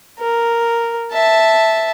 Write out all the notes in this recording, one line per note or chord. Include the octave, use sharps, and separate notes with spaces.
A#4
E5 A5